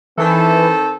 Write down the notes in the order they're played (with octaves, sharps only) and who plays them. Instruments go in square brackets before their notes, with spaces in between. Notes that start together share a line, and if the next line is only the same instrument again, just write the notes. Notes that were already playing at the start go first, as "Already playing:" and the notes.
[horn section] D#3 C4 A4 [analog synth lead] E3